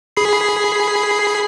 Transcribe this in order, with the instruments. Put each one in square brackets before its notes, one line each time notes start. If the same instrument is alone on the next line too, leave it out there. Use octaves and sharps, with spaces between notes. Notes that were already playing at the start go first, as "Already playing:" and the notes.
[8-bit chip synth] G#4 B5 C7